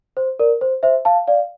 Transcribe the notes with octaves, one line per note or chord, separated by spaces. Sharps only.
C5
A#4 D5
C5
C5 E5
F5 A5
D5 F5